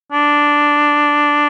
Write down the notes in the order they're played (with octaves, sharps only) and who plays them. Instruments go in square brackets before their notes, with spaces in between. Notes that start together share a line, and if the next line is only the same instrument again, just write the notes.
[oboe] D4